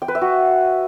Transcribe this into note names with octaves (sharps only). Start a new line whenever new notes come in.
G5
B4
E5
F#4